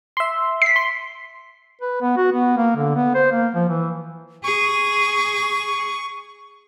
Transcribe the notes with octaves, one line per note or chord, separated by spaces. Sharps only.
E5 C6
B6 C7
C6
B4
B3
F#4
B3
A#3
D3
B3
C5
A#3
F3
E3
G#4 C#6